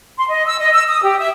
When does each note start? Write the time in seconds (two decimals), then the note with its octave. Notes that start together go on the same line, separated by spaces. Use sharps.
0.17 C6
0.29 D#5
0.47 E6
0.60 D#5
0.73 E6
0.88 D#6
1.04 G4
1.19 E5